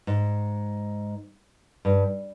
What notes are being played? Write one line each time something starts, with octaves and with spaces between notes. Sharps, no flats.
G#2
G2